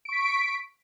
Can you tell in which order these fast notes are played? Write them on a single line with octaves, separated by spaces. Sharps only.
D7 C#6 B6